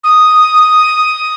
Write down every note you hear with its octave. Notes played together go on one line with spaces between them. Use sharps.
D#6